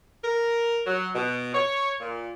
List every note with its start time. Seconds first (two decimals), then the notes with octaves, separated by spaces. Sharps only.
0.24 A#4
0.87 F#3
1.15 B2
1.54 C#5
2.01 A#2